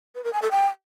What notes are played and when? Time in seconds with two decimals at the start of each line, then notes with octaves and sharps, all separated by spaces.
0.15 B4
0.24 A#4
0.33 G#5
0.42 A4
0.51 G5